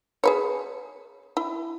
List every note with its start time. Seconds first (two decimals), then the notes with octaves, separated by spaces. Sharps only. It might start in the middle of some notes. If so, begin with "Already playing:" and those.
0.24 G#4 B4 C#5
1.37 E4